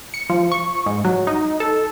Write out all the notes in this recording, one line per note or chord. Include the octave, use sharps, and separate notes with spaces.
C#7
F3
C#6
G#2
F#3
D#4
A4